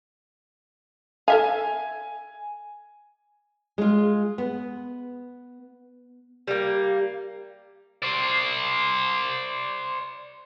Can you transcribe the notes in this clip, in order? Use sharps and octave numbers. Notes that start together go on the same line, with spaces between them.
A4 E5 F5 G#5
G#3 F4
B3
G3 A#3
C5 D5